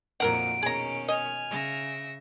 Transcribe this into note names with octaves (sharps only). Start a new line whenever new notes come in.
F2 A#2 D#3 F#3 A#4 F#5 D7
B2 D#3 C#4 G#4 A#5
D#5 G#5 F6
C#3 E5 A#6